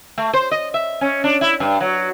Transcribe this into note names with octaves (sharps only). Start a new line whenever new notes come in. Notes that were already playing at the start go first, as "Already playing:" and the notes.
A3
C5
D#5
E5
C#4
D4
E4
G2
F#3